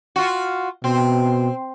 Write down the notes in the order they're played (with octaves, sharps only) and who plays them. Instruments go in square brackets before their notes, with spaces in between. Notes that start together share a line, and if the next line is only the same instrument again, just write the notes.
[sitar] F4 F#4
[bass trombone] B2 [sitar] C4